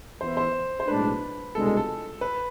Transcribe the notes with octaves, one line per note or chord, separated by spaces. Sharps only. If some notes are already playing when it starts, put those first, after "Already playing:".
E3 B3 E4 C5
C5
C5
B1 A2 G#3 D4 B4
C2 B2 G#3 D4 A4
A4
A4
B4